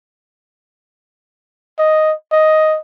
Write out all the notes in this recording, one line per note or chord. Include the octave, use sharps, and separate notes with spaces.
D#5
D#5